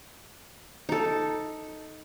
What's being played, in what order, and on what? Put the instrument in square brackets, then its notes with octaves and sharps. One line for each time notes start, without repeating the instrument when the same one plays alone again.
[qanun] D#4 A4